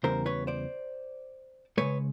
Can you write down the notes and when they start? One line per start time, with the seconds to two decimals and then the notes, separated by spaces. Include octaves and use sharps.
0.04 E2 C#3 E3 G3 A#4 C5
0.26 B4 C#5
0.47 C5 D5
1.77 C#3 F3 G#3 B4 C#5